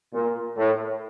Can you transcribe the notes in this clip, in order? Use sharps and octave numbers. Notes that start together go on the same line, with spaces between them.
A#2
A2